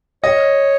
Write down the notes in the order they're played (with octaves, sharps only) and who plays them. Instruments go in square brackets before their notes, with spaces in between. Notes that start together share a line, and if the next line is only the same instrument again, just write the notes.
[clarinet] C#5 [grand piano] D#5